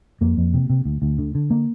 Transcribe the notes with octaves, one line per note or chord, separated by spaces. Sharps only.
F2 A#3
F2
C3
C3
D2
D2
D3
D3
A#3